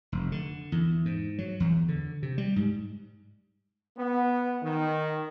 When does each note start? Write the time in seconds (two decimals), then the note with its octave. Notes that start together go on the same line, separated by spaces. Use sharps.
0.12 F1
0.32 D3
0.72 E2
1.05 G#2
1.38 F#3
1.60 E2
1.88 D3
2.23 C3
2.38 G3
2.56 G#2
3.97 B3
4.62 D#3